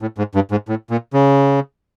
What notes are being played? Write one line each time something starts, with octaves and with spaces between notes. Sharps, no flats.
A2
G#2
G2
G#2
A2
A#2
C#3